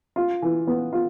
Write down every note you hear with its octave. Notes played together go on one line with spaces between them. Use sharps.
F4
E3
B3
F4